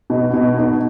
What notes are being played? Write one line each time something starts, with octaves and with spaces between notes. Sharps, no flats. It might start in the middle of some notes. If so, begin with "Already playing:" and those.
B2
B2
D#4